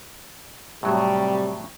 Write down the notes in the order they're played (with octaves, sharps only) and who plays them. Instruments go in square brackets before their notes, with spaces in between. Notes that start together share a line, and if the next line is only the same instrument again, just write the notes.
[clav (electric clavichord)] A2 F#3 [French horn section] C3 G3